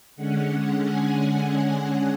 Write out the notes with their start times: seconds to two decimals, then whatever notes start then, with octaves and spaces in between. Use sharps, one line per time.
0.16 D3 G#3 C#4 F#5
0.76 G#5